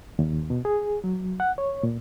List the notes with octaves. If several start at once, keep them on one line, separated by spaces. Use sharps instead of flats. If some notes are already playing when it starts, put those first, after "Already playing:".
D#2
B2
G#4
F#3
F#5
C#5
A#2